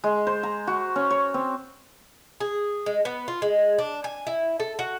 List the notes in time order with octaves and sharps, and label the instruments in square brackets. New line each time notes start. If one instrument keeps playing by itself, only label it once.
[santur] G#3
C5
A#5
F#4
C#4
C#5
C4
[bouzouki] G#4
G#3
B3
F4
G#3
D4
G#5
E4
A4
F#4